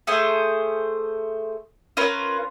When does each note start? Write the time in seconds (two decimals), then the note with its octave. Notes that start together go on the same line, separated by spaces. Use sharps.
0.07 A3 G#4 C5
1.97 C#4 F4 A#4 B4